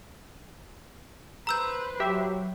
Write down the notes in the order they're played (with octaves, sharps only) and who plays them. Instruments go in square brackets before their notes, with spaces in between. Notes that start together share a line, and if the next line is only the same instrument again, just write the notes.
[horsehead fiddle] B4 C5 [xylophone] A#5 E6 G6
[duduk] F#3 [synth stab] G4 E5